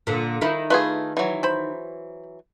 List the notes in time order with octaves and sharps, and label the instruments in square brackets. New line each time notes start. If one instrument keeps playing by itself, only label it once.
[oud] A#2 D3
D#3 D#4 E4
[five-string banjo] A3 F4 G#4 [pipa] B4 B5
[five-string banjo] E3 F#3
[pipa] C5 B5